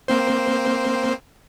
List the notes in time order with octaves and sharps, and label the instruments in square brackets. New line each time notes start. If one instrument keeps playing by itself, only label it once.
[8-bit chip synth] A#3 C4 C5